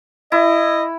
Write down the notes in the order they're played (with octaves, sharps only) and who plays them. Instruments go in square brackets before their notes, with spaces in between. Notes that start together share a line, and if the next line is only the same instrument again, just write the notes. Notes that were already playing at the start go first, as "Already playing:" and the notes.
[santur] E4 [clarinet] D#5